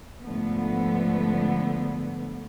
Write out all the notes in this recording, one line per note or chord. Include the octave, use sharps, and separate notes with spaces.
G#2 D3 F3 A3 B3